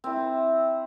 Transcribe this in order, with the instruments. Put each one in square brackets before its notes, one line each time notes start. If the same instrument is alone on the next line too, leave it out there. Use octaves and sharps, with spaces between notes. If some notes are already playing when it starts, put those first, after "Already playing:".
[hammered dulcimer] C4 E4